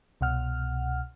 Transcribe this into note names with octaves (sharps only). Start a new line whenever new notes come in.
C2 B2 F#5 F6